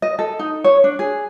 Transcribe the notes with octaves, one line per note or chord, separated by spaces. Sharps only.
D#5
A4
D#4
C#5
D4
G#4